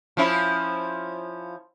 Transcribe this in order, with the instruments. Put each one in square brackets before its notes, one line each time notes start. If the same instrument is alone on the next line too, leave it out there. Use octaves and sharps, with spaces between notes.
[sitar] F3 C#4 E4